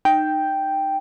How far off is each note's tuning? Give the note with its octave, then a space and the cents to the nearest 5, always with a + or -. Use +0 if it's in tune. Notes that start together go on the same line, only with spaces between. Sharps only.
D#4 -20 G5 +0